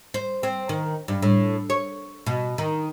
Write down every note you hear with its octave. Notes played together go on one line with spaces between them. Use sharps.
C5
C4
D#3
G2
A2
C#5
B2
D#3